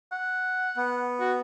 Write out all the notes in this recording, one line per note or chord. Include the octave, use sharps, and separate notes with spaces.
F#5
B3
F#4